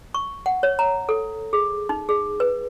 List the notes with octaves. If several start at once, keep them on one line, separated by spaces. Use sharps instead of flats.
C#6
F#5
C#5
A#5
A4
G#4
D#4
G#4
B4